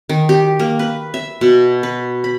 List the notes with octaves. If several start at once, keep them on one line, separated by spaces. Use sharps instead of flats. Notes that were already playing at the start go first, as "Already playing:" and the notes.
D#3
G4
A#3
B4
E5
B2
B4
B5